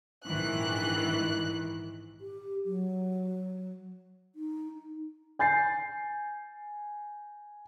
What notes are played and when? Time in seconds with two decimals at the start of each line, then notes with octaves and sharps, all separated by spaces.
0.25 A#1 G#2 D#3 E3 F#6
2.21 G4
2.65 F#3
4.35 D#4
5.39 G#5 G6 A6 C7